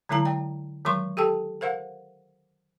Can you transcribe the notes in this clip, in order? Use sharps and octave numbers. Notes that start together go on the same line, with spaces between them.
D3 F#3 G#3 E4 A5 A#5
D5 G5
D#3 F#3 G#3 C6 C#6
G4 A4 G5 A5
A#4 C5 F5 F#5